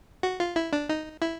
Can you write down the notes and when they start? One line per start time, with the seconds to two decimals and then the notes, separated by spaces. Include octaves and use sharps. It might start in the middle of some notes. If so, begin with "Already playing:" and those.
0.23 F#4
0.40 F4
0.56 E4
0.73 D4
0.89 D#4
1.22 E4